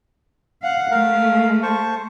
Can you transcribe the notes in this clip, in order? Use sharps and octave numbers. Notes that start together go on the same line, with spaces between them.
F5 F#5
A3 A#4 F5
C5 A5 C#6